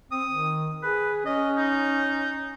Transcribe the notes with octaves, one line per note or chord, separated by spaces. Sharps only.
C4 D#6
D#3
G#4 B4
C#4 D#5
D#4